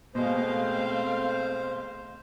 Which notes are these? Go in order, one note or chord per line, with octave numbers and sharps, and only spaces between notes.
B2 G#3 A3 C4 C5 F5